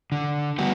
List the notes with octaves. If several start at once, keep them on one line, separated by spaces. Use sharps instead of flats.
D3
G3 B3 F#4